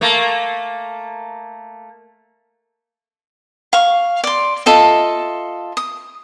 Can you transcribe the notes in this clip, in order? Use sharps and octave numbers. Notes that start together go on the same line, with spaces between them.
A3 A#3
F5 C#6
D5 C6
F4 A4 D#5 E5
D#6